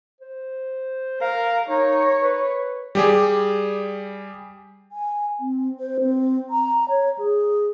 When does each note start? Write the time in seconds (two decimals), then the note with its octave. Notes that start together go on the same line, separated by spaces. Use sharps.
0.20 C5
1.21 A#4 F5
1.69 D#4 C#5
2.22 B4
2.95 G3 G4 G#4
4.92 G#5
5.40 C4
5.80 C5
6.00 C4
6.50 A#5
6.89 C#5
7.18 G#4